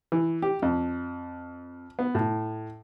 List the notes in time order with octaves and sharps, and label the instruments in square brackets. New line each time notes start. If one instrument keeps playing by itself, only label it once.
[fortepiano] E3
G4
F2
B3
A2